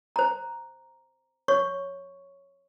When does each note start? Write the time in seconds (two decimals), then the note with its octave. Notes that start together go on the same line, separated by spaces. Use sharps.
0.16 C5 A#5
1.48 C#5 C#6